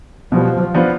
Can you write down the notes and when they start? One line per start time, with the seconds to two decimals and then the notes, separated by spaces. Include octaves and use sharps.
0.32 B2 F3 G3 B3
0.75 F3 B3 D4 F4